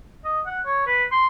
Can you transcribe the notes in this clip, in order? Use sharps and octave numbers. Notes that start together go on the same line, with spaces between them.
D#5
F#5
C#5
B4
C6